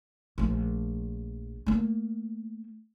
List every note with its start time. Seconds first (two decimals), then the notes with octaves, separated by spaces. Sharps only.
0.38 A#1 A3
1.66 A3 A#3